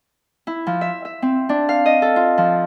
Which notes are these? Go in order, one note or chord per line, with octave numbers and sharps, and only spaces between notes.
E4
F3
E5
E5
C4
D4
F5
D#5
A4
F4
F3